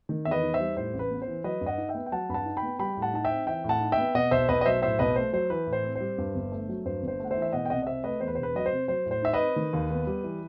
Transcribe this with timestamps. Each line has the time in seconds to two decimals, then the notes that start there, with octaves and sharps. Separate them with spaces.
0.09 D#3
0.25 E2 E5
0.31 B4 D#5
0.43 D#4
0.54 C5 E5
0.60 G3
0.76 A2 C5
0.93 A1
0.99 B4
1.10 B3
1.22 C5
1.27 E3
1.44 F#3 B4 D#5
1.61 G2
1.66 D#5 F#5
1.78 D#4
1.89 E5 G5
1.95 B3
2.06 G5
2.12 F#3 F#5 A5
2.29 G2 B5
2.34 F#5 A5
2.46 D#4
2.57 G5 B5
2.63 B3
2.79 G3 G5 B5
2.97 A2
3.02 F#5 A5
3.14 D#4 A5
3.25 E5 G5
3.30 C4
3.47 E3 E5 G5
3.64 A2
3.69 F#5 A5
3.81 D#4
3.92 E5 G5
3.98 B3
4.15 B2 D#5 F#5
4.31 B1 C5 E5
4.49 B1 B4 D#5
4.61 D#5
4.65 F#3 C5 E5
4.82 A2 C5 E5
4.99 B1 B4 D#5
5.16 A3 C5
5.33 F#3 C5
5.50 E3 B4
5.67 A2
5.73 C5
5.84 C4
5.95 G3 C5
6.18 G2
6.35 G1
6.52 A3
6.69 F#3
6.85 G2 C5
7.03 G1
7.08 C5
7.20 A3 F#5
7.31 C5 E5
7.36 E3
7.42 E5
7.53 B2 D#5 F#5
7.65 G5
7.70 C2 D#5 F#5
7.82 D#5
7.86 C2 C5 E5
8.04 A3 B4 D#5
8.20 E2 C5
8.28 B4
8.35 C5
8.38 E1
8.43 B4
8.55 F#3 D#5
8.66 C5
8.72 C3
8.88 F#3 C5
9.06 A2
9.11 C5
9.22 D#4 E5
9.33 B4 D#5
9.39 C4
9.56 D#3
9.73 D#2
9.90 B3
10.07 G3
10.23 E3